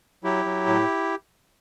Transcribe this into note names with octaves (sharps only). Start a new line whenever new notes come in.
F#3 E4 G4
F#3
A2